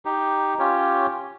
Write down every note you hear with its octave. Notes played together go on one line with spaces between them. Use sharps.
D#4 G4
C#4 F4 G4 C#5